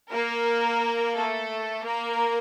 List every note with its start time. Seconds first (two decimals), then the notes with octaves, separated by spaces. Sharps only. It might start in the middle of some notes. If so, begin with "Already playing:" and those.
0.11 A#3 A#4
1.15 A3 A4
1.84 A#3 A#4